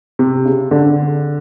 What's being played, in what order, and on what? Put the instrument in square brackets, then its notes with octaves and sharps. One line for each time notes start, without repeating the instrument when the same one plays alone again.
[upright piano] C3
C#3
D3